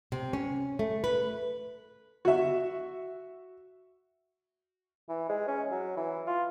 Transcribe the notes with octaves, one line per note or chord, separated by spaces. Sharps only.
C3
C#4
A3
B4
F#4 E5
E3
G#3
C#4
F#3
E3
F4